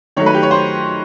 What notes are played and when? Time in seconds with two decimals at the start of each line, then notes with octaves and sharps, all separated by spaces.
0.17 D#3 F#3 A3 C#5
0.26 B4
0.34 G4
0.43 C#5
0.51 C5